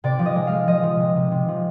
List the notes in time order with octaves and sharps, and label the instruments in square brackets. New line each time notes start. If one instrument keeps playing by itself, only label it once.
[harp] C3 D5
F3
D#5
G#3
G#3 F5
F3 D#5
F3
C3
C3
C3
F3